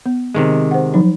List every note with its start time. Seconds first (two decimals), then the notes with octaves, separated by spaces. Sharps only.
0.06 B3
0.35 C3 D#3 G#3
0.71 C5 F#5
0.94 F3 F#3 D#4